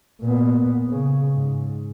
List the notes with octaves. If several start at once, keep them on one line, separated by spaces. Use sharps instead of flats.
A#2 B3
C#3
G#2